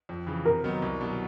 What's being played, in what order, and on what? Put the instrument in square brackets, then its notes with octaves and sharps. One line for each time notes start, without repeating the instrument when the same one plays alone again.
[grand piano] F2
C#3 E3
[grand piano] C3 [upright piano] A#4
[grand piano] D#3 F#3 B3
C2
B2 F#3